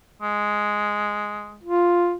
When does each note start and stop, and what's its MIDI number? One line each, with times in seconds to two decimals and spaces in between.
0.22 1.60 56
1.63 2.16 65